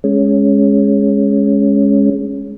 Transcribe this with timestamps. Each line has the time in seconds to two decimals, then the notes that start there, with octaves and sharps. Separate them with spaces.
0.04 G#3 C#4